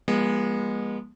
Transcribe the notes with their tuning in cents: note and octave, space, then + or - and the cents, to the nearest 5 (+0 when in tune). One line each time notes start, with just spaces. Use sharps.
F3 +0 G#3 -20 B3 -40